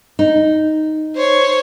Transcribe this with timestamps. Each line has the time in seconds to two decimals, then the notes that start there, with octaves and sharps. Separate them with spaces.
0.19 D#4
1.15 C5 C#5